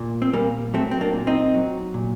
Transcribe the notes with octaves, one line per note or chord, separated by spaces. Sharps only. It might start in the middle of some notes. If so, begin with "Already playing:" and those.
Already playing: A#2
C4
A#2 G3 A#3
F#3 A3 C4
C4
A#3 D4
A#2
C4 D#4
F#3
A#2